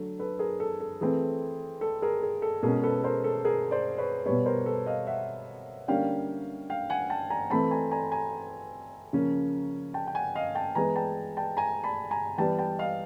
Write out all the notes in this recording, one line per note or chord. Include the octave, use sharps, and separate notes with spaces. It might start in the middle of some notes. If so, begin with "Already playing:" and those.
Already playing: D3 F#3 A3
A4 B4
G#4 A#4
A4
A4
E3 A3 C4 G#4
A4
G#4 A#4
G#4
A4
B2 G#3 C#4 G#4 A#4
A4 B4
A#4 C5
A4
G#4 A#4
C5 D5
B4 C#5
B2 G3 B3 B4 C#5
A#4 C5
A4 B4
D#5 F5
E5 F#5
D3 G3 A#3 C#4 F5 G5
F5 G5
F#5 G#5
G5 A5
G#5 A#5
E3 A3 C4 A5 B5
G#5 A#5
G#5 A#5
G#5 A#5
C#3 F3 A#3 C#4
G5 A5
G5
F#5 G#5
D#5 F5
G5 A5
E3 G#3 B3 G#5 A#5
G5 A5
G5 A5
G#5 A#5
A5 B5
G#5 A#5
E3 G3 B3 G5 A5
G5 A5
D#5 F5